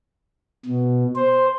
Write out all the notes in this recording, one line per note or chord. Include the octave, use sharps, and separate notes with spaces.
B2
C5